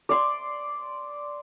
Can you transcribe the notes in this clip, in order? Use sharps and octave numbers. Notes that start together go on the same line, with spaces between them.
D5 C6